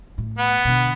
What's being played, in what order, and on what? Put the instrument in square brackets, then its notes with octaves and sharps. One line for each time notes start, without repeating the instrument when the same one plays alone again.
[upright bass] A2
[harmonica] B3
[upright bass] B2 D3